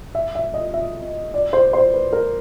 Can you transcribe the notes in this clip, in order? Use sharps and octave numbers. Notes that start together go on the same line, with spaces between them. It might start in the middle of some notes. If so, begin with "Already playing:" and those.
E5
E5
D#5
E5
D5
C5
C5
B4
A#4